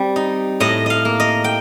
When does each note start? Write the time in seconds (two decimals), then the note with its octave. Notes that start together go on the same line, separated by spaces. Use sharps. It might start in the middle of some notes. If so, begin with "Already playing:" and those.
Already playing: G3 C4
0.16 D#4
0.60 A2 D#5
0.86 D#5 F5
1.05 A#3
1.20 D#5
1.44 G5